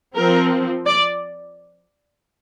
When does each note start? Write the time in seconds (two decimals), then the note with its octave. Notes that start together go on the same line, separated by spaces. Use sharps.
0.15 F3 C4 A#4
0.86 D5